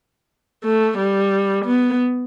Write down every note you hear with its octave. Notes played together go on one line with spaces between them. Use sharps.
A3
G3
B3